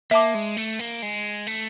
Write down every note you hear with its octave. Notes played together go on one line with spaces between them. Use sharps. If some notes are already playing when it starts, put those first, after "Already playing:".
A#3 E5 A5 D6
G#3
A3
A#3
G#3
A3